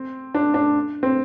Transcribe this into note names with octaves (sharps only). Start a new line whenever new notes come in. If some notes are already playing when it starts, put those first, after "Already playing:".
Already playing: C4
D4
D4
C4